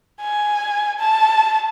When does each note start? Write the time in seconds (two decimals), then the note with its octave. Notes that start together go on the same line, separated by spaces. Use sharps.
0.22 G#5
0.99 A5